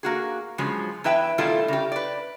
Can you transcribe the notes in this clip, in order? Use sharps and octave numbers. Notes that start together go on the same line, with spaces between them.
A#3 F#4 G#4
C#3 F3 F#3 G#3
E2 E4 B4 E5 G5
B2 D#3 G3 A3 E4 F4
C#3 G4
B4 D5